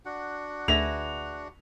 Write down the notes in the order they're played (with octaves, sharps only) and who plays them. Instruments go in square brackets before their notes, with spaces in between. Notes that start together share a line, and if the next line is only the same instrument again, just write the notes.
[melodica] D4 F#4 F#5
[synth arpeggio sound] D2 A#6 [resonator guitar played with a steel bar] G#4 B4 E5 [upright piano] F7